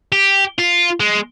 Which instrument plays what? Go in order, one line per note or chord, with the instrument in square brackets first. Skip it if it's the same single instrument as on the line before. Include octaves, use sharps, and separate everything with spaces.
[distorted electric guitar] G4
F4
G#3